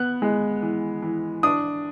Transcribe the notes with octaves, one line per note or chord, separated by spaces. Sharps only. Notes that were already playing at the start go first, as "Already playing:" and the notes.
Already playing: B3 F#6
G#3
E3
E3
D4 D#6